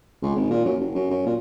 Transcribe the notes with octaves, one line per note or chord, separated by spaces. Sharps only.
C#2
G#1
A#2
F#2
F#1
F#2
F#2
A#2